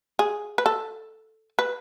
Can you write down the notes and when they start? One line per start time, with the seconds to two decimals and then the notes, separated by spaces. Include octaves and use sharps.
0.19 G#4
0.58 B4
0.66 A4
1.59 B4